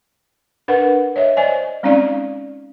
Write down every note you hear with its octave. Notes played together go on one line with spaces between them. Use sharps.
D4 A#4 B4 F#5
C#5 D#5 E5
C5 D5 D#5 G#5
G#3 C4 C#4 D#4 D5 F5